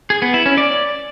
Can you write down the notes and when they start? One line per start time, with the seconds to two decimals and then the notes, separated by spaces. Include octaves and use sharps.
0.10 G#4
0.22 B3
0.34 E4
0.46 C#4
0.58 D5